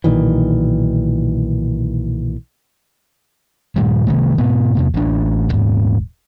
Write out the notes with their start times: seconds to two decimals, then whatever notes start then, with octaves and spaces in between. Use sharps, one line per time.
0.04 B1 A#2 D#3 E3
3.76 G2 A#2 D#3 G3
4.07 C3 D#3 A3
4.38 G#2 B2 B3
4.75 E2 C3 A#3
4.94 A1 D4
5.49 D#1 G#2